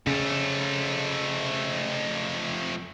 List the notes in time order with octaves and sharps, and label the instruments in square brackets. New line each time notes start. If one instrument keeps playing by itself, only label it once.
[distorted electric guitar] F2 A3 [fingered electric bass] C#3